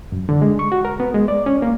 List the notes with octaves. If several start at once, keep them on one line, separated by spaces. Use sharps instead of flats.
F#2
D3
G#3
C#6
F#4
A#4
B3
G#3
D5
C#4
A#3